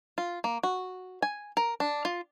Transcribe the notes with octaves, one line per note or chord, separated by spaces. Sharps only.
F4
A#3
F#4
G#5
A#4
D4
F4